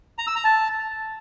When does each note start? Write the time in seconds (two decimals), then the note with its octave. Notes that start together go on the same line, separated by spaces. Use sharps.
0.18 A#5
0.27 E6
0.36 A#5
0.44 A5